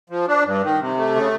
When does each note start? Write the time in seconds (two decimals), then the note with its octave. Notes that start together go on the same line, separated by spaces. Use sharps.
0.10 F3
0.28 D4
0.45 G2
0.63 D#3
0.80 C3
0.97 A3
1.16 C#3